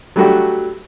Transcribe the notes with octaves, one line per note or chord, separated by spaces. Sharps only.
F#3 G3 A3 D4 F#4 G4